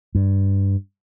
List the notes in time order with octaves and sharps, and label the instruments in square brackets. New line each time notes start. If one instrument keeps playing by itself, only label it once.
[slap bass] G2